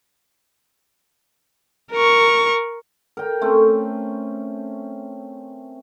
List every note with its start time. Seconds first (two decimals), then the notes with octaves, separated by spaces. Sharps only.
1.92 A#4 C#6
3.17 A#4 G5
3.42 A3 C4 C#4